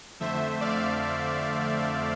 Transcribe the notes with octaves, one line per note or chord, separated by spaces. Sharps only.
F2 D3 A3 C5 E5
D5 F5